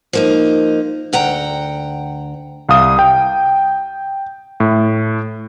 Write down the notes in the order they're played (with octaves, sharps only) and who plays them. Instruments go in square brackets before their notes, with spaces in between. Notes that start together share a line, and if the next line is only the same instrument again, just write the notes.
[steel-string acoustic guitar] F3 A#3 D#4
D2 F#5 G5 A#5
[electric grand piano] C2 F5 D#6
G5
A2